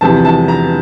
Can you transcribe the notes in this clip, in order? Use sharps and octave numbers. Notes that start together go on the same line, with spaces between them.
E2 C3 F3 A5
A5
A#5